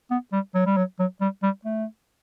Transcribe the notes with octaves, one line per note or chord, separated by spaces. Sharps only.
B3
G3
F#3
G3
F#3
F#3
G3
G3
A3